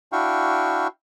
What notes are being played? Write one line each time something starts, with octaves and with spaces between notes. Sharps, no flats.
D4 E4 F#4 F5 G5 C#6